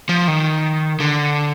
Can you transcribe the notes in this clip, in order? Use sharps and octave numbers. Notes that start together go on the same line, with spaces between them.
F3
D#3
D3